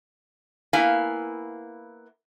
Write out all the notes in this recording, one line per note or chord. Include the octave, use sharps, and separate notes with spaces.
A#3 B3 E4 F5 G#5